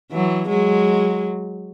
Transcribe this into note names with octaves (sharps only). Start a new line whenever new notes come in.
E3 F#3
F#3 G#3